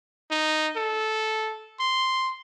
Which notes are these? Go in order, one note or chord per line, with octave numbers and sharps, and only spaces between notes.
D#4
A4
C6